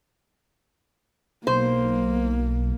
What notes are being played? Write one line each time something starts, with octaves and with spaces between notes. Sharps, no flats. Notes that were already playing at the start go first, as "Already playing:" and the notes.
B1 A#3 C5